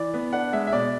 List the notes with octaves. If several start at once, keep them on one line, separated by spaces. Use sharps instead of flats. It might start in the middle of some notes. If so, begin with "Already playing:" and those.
Already playing: E3 D5
B3
D4 F#5
G#3 E5
E5
B2 D5